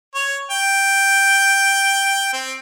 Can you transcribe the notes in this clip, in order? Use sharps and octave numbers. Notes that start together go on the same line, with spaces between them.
C#5
G5
C4